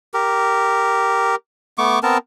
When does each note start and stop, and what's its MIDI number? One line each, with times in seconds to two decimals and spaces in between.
0.14 1.35 67
0.14 1.35 70
1.78 1.99 57
1.78 1.99 59
1.78 1.99 85
1.78 1.99 86
2.03 2.18 59
2.03 2.18 60
2.03 2.18 70
2.03 2.18 81